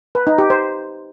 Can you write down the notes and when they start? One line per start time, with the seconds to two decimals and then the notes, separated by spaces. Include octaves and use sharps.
0.15 B4
0.27 D#4
0.38 G4
0.50 C5